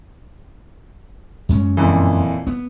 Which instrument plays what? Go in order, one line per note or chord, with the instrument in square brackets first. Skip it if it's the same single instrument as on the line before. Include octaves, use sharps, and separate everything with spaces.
[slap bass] F#2 G#3 C#4
[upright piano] F2 A#2 E3
[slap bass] B3